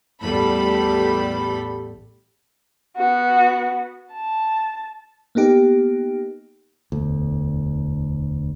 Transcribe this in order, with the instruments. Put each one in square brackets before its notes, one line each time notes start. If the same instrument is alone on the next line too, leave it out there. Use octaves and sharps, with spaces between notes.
[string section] A1 E2 G3 A3 A4 B5
[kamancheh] B3 F#4
A5
[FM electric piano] A#3 B3 D#4 G4
[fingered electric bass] E1 D2